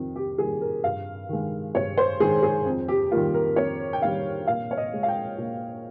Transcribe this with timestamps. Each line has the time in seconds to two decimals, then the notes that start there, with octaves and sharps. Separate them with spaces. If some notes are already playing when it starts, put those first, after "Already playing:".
Already playing: F2 D#3 G3
0.16 G4
0.38 D#3 G3 A#3 G#4
0.61 A#4
0.84 G2 F5
1.29 D#3 G#3
1.75 G2 C#5
1.97 C5
2.20 D#3 G#3 G#4
2.43 G#4
2.66 F2
2.88 G4
3.11 D#3 G3 A#3 F4
3.34 A#4
3.56 F2 C#5
3.93 G5
4.01 D#3 G3 A#3 F5
4.47 A#2 F5
4.71 C#5
4.78 D#5
4.93 G#3
5.03 F5
5.08 G5
5.38 A#2